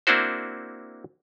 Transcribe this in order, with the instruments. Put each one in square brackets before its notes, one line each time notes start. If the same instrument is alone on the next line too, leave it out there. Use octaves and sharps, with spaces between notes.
[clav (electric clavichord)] A#3 C4 D4 E4 F#4 C5